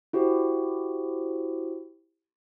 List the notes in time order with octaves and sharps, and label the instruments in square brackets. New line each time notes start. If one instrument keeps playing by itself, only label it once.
[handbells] E4 F#4 G4 C5